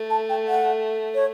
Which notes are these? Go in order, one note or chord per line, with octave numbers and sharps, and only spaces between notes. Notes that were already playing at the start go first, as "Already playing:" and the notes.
Already playing: A3
A5
G5
F#5
C#5